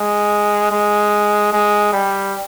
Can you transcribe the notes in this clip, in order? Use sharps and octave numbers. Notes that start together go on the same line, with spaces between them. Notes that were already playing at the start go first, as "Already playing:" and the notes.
Already playing: G#3
G#3
G#3
G3